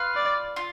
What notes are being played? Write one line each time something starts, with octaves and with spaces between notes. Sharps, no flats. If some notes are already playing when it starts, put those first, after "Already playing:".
Already playing: F4 B4 F5
D5
F4